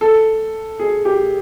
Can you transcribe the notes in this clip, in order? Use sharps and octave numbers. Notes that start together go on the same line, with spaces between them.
A4
G#4
G4